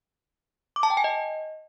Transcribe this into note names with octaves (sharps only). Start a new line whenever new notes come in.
D6
A5
G5
G#5
D#5